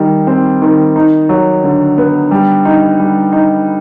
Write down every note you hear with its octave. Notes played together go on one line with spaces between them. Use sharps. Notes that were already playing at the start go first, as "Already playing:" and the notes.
Already playing: D#3 G3
C4
D#3
D#4
F#3
D3
B3
G3
D#4
G3
D#4